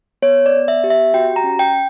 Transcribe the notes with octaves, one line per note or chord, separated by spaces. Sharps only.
B3 C#5
D5
B3
E5
G4
E5
F#4 G5
A#5
C#4
G5